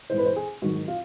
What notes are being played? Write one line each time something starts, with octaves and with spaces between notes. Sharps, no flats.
G#2 E3 C5
B4
C5
G#4
G#2 D#3 F#3 F#4
F4